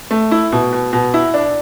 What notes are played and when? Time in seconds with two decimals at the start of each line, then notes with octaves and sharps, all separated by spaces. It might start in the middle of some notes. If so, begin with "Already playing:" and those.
0.11 A3
0.31 E4
0.52 B2
0.73 B2
0.93 B2
1.14 E4
1.34 D4